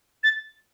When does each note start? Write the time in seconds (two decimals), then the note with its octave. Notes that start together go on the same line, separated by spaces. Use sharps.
0.24 A6